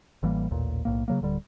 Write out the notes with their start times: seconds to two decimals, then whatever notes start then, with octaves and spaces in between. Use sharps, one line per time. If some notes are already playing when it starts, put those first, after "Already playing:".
0.23 A1 E3 G3 A#3
0.51 A1 D#2 A#2
0.85 B1 E2 A2 A#3
1.08 C#3 F#3 A#3
1.22 D1 D3 G3